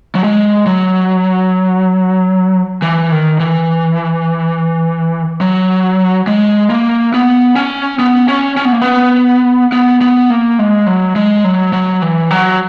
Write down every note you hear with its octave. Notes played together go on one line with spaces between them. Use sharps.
F#3
G#3
F#3
E3
D#3
E3
F#3
G#3
A#3
B3
C#4
B3
C#4
C#4
B3
A#3
B3
B3
B3
A#3
G#3
F#3
G#3
F#3
F#3
E3
F#3